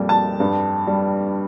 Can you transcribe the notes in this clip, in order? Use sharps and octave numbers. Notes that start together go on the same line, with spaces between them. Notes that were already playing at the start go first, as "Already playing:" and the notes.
Already playing: F2 A#2 G3
A5
G2
G3